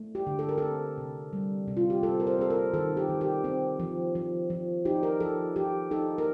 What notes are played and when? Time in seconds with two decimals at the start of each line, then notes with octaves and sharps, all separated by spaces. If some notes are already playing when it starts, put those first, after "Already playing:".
Already playing: A3
0.15 G4
0.27 D3
0.39 A4
0.49 A#4
0.58 C4 A4
0.98 C3
1.33 G3
1.68 C3
1.77 F4
1.90 G4
2.03 C4 A4
2.20 A#4
2.27 C5
2.39 C4 A4
2.50 A#4
2.74 D#3 A4
2.97 G4
3.09 D#3
3.21 G4
3.44 C4
3.80 F3
4.15 F3
4.50 F3
4.85 D#4 G4
5.03 A#4
5.20 F3 A4
5.56 F3 G4
5.91 D#4 A4
6.18 A#4